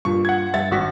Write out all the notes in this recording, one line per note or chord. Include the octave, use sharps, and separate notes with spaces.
G2 A#2 C#6
F#5 G#6
G2 E5 A6
G#1 F#4 B6